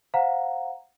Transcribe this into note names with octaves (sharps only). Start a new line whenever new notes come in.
C5 F5 F#5 A#5